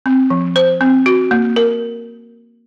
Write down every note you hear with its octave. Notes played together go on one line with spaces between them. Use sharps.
C4
F3
C5
C4
F#4
A#3
A#4